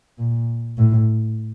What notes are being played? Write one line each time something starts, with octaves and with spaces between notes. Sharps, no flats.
A#2
A2